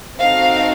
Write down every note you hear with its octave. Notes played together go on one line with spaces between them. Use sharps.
C4 D#4 F#4 A4 F5